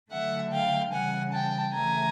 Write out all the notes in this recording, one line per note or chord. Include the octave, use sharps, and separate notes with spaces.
D3 F#3 A3 E5 F#5
F5 G5
C#3 E3 G3 F#5 G#5
G5 A5
C#3 E3 A3 G#5 A#5